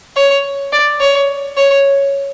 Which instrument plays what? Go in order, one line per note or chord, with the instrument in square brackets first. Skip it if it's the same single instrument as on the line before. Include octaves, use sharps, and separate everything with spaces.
[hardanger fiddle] C#5
D5
C#5
C#5